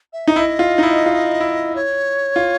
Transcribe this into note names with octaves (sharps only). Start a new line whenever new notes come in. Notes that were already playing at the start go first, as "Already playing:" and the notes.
E5
D#4
E4 D#5
F4
D#4
E4
F4
E4
C#5
F4